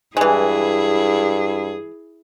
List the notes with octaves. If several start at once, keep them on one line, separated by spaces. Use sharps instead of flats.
G2 E3 G#3 E4 G#4